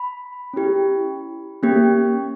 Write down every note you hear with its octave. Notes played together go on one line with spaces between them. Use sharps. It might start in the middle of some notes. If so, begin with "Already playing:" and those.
Already playing: B5
C#4 E4 G4
A#3 C#4 G4